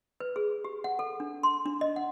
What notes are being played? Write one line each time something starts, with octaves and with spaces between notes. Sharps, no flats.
B4
G#4
G4
F#5
A4
D4
C6
D4
D#5
F#5